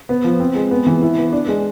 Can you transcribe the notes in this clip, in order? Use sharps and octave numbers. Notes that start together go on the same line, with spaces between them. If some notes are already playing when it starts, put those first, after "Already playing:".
B3
F3
C4
G#3
B3
E3
E4
B3
D4
G#3